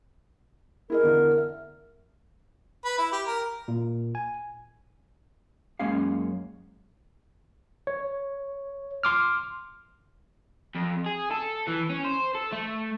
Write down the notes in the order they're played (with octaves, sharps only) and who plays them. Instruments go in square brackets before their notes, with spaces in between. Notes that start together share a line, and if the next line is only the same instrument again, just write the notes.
[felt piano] E4 G#4 D#5 [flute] A#4
[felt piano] E2 D3
E5
[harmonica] B4
E4
G4
A#4
[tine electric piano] A#2
G#5
[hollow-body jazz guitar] F#2 G#3 A#3 C#4 G#4 F5
[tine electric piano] C#5
C6 D6 F6
[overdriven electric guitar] F2
G#4
A4
E3
C#4
C5
A4
A3